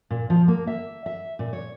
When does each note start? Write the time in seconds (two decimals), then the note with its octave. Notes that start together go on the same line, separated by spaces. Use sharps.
0.10 A#2
0.30 F3
0.48 A#3
0.67 E5
1.06 E5
1.39 A#2
1.53 C#5